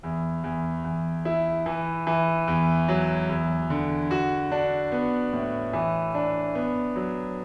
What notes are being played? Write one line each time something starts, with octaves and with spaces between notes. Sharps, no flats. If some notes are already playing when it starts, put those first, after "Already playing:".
E2
E2
E2
E4
E3
E3
E2
F#3
E2
D3
F#4
D4
B3
A2
E3
D4
B3
F#3